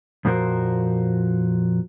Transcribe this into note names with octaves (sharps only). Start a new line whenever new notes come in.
F2 A#2 F3 F#4 A#4 C5